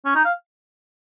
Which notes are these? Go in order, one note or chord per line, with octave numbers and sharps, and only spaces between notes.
C#4
D#4
F5